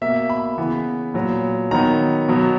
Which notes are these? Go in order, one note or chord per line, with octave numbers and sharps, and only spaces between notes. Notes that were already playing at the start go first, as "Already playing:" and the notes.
B2 A#3 E5
B5
C#3 E3 B3
A#2 F#3 B3
D#3 F#3 B3 A#5
B2 F#3 B3